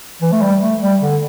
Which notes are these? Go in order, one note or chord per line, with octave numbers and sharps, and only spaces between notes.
E3
A3
G3
A3
G3
D3